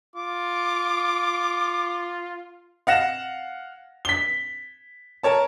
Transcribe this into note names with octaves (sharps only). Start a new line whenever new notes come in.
F4 D6
F5 F#5 A#6 E7
B6 G7
A#4 C#5 A5